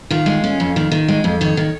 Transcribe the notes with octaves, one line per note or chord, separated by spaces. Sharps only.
D#3 F4
G#3
C#4
F2
D#3
D#3
G#3
F2
D#3 C#5
D#3